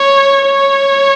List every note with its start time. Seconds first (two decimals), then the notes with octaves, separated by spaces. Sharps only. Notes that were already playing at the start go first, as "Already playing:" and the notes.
Already playing: C#5
0.46 C#5